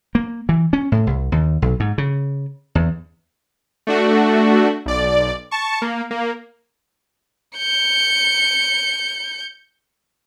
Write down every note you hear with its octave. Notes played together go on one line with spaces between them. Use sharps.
A#3
E3
C#4
A2
C2
D#2
B1
G#2
C#3
E2
A3 D4 F#4
B1 D5
A5 C#6
A#3
A#3
G6 C#7